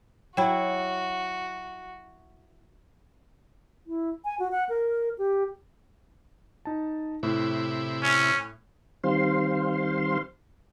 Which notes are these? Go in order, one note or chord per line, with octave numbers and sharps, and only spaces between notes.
F#3 E4 F#4 G5
E4
G#5
F#4
F#5
A#4
G4
D#4 A5
A2 C3 E4
C#4
D#3 G3 C4 C5 F5 C6